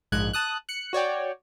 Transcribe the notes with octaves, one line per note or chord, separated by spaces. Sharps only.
A#1 G#2 G#3 F#6 G#6
A5 D#6 F#6
F#6 C#7
F#4 C#5 D5 G5